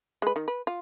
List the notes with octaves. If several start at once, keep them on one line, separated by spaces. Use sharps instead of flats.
G#3 B4
D#3
B4
F4